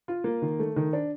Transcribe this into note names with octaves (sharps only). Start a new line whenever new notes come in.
F4
A#3
D#3
A3
D#3
D4